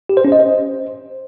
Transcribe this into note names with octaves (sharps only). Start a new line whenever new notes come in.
G4
C5
C#4
D#5
C5